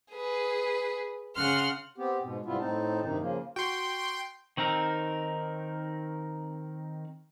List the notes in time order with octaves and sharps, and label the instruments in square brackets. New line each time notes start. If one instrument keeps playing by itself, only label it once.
[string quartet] G#4 B4
C#3 F#5 C6 F6
[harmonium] B3 C4 G4
G#2 B2
G#2 C3 G3 B3 E4 F4
A2 C4 D#4 A5
G2 C3 D#3 D#4
C#3 F3 A#3
[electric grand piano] F#4 [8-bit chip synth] G5 C6
[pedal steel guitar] D#3 C4 D#4 A#4